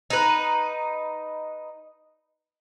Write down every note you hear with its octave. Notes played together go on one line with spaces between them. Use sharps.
D#4 B4